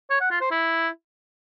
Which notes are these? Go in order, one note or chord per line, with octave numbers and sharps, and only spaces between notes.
C#5
F#5
F4
C5
E4